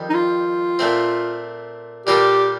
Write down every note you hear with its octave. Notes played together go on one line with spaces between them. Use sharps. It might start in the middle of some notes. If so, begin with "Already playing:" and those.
Already playing: F2 D#3 G3
D#4
F4
A#2 A3 C4
A#2 G3 A#3 F4 G4 A4